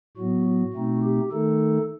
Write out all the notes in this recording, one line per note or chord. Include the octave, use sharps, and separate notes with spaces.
A2 F#3 B3 F#4
F#4
B2 A3 C4 D#4
G4
D#3 A3 D#4 A4